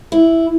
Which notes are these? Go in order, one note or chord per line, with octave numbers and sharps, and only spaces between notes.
E4